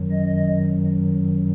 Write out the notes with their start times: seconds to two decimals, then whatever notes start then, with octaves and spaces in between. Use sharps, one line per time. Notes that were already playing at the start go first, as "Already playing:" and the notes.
Already playing: F#2 D#3 F#3
0.11 D#5